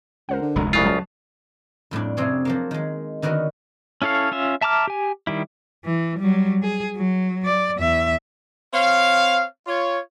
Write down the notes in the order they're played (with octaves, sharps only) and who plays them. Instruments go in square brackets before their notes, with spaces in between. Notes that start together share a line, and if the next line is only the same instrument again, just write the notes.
[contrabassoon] C#2 [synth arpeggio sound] A#4 C5 F#5
[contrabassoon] D3
[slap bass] F1 G#3 [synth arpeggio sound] D2 A#5
[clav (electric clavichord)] C2 C#3 F4 [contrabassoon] A2 [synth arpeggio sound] D#6 F#6
[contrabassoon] C#2 [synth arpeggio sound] F#3 A5
[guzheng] F2 A2 G3 D4
F2 C3 C4 G#4 C#5
F3 F#3 A#3
D#3 G#3
D3 D#3 B3 F#4 A#4
[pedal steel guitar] C#4 E4 A4 C#5 F5
C#4 F4 E5
E5 A5 A#5 D6 F6
G4 G#5
D#3 G3 E4
[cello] E3
F#3 G3
G#4
F#3
D5
E2 E5
[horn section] C4 C#5 F5
F4 C#5